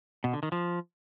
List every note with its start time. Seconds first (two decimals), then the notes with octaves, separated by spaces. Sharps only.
0.24 B2
0.33 D3
0.43 D#3
0.52 F3